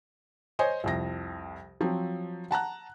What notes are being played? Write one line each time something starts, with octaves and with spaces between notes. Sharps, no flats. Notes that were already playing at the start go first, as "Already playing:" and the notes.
C5 C#5 D#5 G#5
C2 F2 A#6
F3 F#3 C4
F#5 A5 A#5 F#6